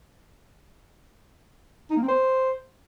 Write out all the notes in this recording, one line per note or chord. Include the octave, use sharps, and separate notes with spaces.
D#4
A#3
C4
C5